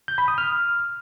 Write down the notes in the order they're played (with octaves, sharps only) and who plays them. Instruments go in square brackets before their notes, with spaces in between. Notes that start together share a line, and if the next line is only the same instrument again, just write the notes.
[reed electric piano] G6
B5
D#6
F6